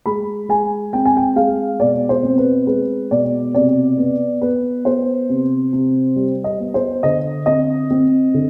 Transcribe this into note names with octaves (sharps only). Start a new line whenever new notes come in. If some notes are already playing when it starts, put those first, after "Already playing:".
G#3 B5
G#3 G#5
C4 G5
G#5
G5
G#3 F5
B2 D5
C5
C4
B4
G#3 B4
B2 D5
C3 D5
B3
B3 B4
B3 C5
C3
C3
G3
D#5
B3
C5
D3 D#5
C4 D#5
C4
D3